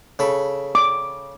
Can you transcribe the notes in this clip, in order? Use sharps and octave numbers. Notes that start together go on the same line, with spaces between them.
C#3 A4 B5
D6